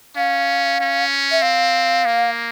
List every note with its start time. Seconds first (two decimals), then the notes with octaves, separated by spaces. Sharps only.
0.16 C#4 F5
0.80 C#4
1.32 E5
1.42 C4 F5
2.06 A#3